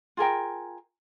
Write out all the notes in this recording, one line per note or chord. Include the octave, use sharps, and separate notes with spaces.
F4 G#4 A#4 G5